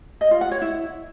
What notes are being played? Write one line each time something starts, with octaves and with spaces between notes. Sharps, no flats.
D#5
F4
F#5
C#5
E4